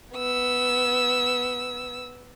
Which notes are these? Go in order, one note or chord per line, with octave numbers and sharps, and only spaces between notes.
B3 E6